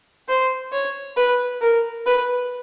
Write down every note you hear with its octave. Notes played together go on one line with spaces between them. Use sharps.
C5
C#5
B4
A#4
B4